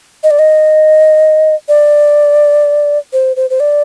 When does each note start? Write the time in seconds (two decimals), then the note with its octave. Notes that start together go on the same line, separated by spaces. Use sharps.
0.23 D#5
0.30 D5
0.39 D#5
1.68 D5
3.13 C5
3.36 C5
3.50 C5
3.60 D5